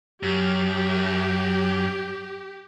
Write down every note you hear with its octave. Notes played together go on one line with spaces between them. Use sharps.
F#2 G4